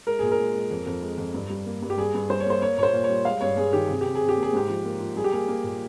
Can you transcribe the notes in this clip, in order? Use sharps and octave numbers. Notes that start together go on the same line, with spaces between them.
G#3 A#4
A#2 G#4
A#4
G#3
G#3
F2
F2
G#3
F2
G2
G3
A#3
G2
G4
G3 G#4
G2
G3 C5
C#5
A#3 C5
A#3 C#5
A#2 C#5
C5
A#2
C#5
G3
G#3 F5
G2 C#5
G2 G#4
D#3 G4
C3 G#4
C3 G4
G#4
C3
G4
A#3
G#4
G#2 G4
F3
A#3
F3
G3 G#4
G4
A#3 G#4
A#3
A#2